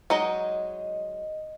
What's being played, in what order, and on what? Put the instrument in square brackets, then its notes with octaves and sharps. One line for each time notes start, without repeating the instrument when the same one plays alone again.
[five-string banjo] F#3 G#3 D#4 [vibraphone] D#5